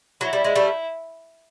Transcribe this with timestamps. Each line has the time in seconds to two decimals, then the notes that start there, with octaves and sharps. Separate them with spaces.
0.21 F#3 E4
0.33 G3
0.44 G#3
0.56 G3 A3